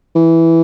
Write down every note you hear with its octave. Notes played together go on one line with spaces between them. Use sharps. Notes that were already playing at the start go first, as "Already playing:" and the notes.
E3